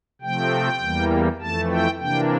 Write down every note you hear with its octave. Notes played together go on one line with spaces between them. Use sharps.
C3 F3 A3 C4 G5
E2 E3 G3 A#3
F2 E3 A3 A5
G5
C3 E3 A#3 D4 G5